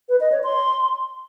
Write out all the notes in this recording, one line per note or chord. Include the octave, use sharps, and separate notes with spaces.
B4
D#5
C#5
C6